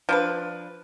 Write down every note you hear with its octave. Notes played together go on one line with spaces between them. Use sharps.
F3 D4 B4